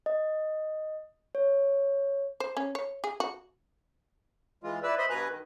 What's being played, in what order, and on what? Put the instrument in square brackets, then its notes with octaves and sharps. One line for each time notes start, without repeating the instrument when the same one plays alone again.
[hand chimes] D#5
C#5
[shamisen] C5
C#4
C#5
G#4
F#4
[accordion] E3 G#3 F4
E4 B4 D5 E6
C5 D#5 E5 B5 C6
G2 B2 B4 G#5 A#5 F#6
D#3